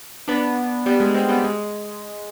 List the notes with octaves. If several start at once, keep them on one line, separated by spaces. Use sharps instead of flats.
B3 D4
G3 B3
G#3
G#3 C4
G3 B3
G#3